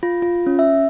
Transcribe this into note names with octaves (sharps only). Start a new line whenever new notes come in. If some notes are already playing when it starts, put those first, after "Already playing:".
F4
F4
C#4
E5